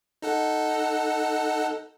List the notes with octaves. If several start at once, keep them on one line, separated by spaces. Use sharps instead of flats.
D#4 A4 F#5